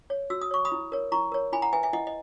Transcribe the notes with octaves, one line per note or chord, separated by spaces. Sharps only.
C#5
F#4 E6
D#6
C#5 C#6
B5 D#6
E4
A#4 C#5
E4 A#5 C#6
A#4 C#5
E4 G#5 B5
F#5 A#5
B4 E5 G#5
E5 G#5
E4 D#5 F#5
D#5